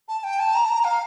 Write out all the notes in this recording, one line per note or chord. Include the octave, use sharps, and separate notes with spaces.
A5
G5
A5
A#5
A5
A#5
F5